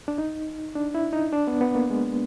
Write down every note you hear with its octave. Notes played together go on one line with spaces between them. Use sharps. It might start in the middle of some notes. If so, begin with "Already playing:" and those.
D4
D#4
D4
E4
D#4
D4
B3
B3
A#3
G#3